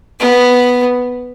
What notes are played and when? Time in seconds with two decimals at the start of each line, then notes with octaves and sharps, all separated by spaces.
0.19 B3